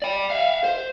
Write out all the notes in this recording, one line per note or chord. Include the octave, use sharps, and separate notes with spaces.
D5 G5
E5 F5
C5